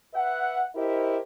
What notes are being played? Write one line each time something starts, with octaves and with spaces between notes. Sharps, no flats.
B4 E5 F#5
E4 G4 A#4 C5 D#5